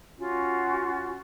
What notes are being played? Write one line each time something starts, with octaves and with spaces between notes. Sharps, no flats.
C#4 F4 F#4